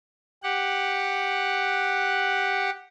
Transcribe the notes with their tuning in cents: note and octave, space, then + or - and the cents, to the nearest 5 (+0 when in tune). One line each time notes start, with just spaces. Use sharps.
G4 +5 F#5 +0